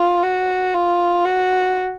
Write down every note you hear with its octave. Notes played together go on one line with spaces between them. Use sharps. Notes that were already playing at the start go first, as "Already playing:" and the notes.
Already playing: F4
F#4
F4
F#4